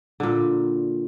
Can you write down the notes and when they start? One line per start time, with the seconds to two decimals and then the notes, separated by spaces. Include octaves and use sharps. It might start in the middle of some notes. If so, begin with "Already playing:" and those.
0.20 A#2 D3